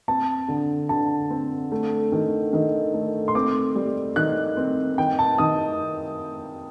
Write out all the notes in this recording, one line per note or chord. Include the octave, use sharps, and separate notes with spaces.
C4 A5
D3
D3 A5
C4
A3
D#3
D#3
A3
C6
C4 D6
G3
D#3 F#6
C4
D#3 G5
A5
D#3 D#6